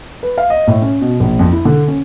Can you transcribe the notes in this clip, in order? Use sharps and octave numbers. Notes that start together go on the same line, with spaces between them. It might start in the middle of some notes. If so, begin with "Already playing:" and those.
B4
F5
D#5
A2
C#4
B2
A#1
F2
E4
D3
C#4